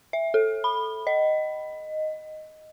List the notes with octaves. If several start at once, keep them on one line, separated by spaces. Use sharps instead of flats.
E5
A4
B5
D#5